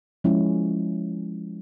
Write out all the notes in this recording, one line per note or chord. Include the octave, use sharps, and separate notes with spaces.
F3 G#3 C#4 E4